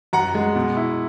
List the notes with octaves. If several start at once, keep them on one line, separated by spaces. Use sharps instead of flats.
F#2 F#5 A#5
G#3
B2
E4